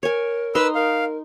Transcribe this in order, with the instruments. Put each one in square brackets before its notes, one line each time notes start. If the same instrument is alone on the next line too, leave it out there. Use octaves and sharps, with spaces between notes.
[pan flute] A#4 [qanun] C#5 G#5
[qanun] D#4 C6 [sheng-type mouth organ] B4 E6
[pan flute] A#4 [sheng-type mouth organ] F5